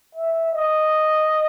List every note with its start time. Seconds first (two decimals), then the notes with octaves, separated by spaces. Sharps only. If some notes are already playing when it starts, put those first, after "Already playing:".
0.15 E5
0.53 D#5